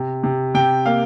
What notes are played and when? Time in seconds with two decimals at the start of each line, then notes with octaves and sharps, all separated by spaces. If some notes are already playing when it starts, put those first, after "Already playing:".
Already playing: C3
0.24 C3
0.54 C3 G5
0.85 A#3 F5